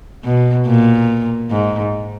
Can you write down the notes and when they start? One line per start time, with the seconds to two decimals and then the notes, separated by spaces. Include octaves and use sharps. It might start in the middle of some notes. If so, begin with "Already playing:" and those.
0.24 B2
0.66 A#2
1.50 G#2